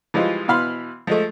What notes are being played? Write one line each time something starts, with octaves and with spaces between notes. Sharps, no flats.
E3 F3 G3 G#3 F4
B2 E3 F5 B5 C6
F3 G#3 A3